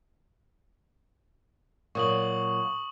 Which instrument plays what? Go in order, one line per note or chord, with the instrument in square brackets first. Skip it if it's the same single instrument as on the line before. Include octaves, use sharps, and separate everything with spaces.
[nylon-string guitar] A#2 F#3 [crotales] C#6 D#6 F#7